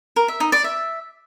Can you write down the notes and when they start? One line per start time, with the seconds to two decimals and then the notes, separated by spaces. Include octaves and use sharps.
0.16 A#4
0.28 E5
0.40 D#4
0.52 D5
0.64 E5